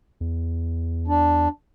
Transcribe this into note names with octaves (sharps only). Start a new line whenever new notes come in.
E2
D4